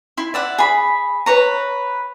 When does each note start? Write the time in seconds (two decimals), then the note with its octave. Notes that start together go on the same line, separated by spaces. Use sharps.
0.17 E4 C6
0.34 D5 E5 F#5
0.58 G#4 B5
1.26 B4 C#5 A#5